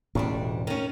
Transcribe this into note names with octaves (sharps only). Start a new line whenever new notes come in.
E1 D2 A2 G3 C#4 D4
D#3 C#4